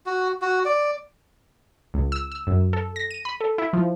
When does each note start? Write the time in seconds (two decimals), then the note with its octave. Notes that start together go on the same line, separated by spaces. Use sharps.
0.06 F#4
0.42 F#4
0.65 D5
1.94 C#2
2.12 E6
2.32 E6
2.47 F#2
2.73 A4
2.96 A#6
3.11 D#7
3.25 B5
3.41 A4
3.58 E4
3.73 F3